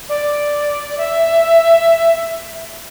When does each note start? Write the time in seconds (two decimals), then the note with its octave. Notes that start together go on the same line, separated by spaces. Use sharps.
0.09 D5
0.98 E5